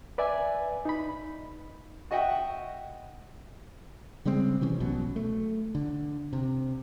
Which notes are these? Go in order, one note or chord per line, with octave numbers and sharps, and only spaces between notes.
B4 D5 E5 G#5
D#4 B5
F#4 D#5 E5 F#5 G5
C#3 G3 G#3 C4
C3 E3 C#4
C2 B2 F#3
A3
D3
C3